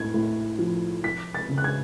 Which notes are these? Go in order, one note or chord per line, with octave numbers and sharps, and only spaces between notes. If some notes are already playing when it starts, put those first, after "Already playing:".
Already playing: A2 G#6
A2
F3
F3 B6
A6
C#3
F#6
G#6